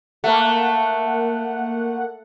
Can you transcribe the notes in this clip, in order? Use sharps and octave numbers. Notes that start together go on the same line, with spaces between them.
A3 A#3 F#5